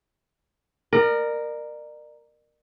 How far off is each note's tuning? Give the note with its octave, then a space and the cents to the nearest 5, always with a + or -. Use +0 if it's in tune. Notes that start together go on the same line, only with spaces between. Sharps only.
A#4 +0 D5 +40